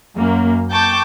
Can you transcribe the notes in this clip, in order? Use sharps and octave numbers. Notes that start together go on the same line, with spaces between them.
F#2 A#3
G5 A5 C#6 D6 G6